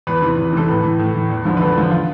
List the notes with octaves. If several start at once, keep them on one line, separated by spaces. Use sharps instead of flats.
E2 B4
C3 E3
E2
C3 E3 A4
A2 B4
E3
A2
E3
E2
D3 F3
B4
E2 A4
D3 F3
F4